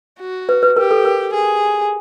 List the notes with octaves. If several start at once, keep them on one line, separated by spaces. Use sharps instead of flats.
F#4
B4
B4
G4 A#4
A4
A#4
G#4